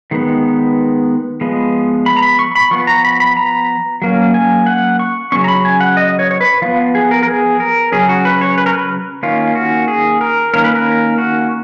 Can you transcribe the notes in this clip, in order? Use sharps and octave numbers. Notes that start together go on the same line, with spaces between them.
D#3 G#3 B3
F3 G#3 B3
B5
A#5
B5
C#6
B5
F3 B3 C#6
A#5
B5
B5
A#5
F#3 A#3 C#4
G#5
F#5
C#6
C#3 F#3 A#3 C#4 C#6
A#5
B5
G#5
F#5
D#5
C#5
C#5
B4
F3 B3 F4
G#4
A#4
A#4
G#4
A#4
C#3 F#3 C#4 G#4
F#4
B4
C#5
B4
A#4
B4
D#3 A#3 C#4 F4
F#4
G#4
A#4
D#3 A#3 C#4 A#4
B4
A#4
F#4